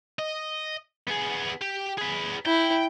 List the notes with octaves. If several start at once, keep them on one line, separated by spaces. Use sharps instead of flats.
D#5
B3 G#4
G4
G#4 B4
E4 G5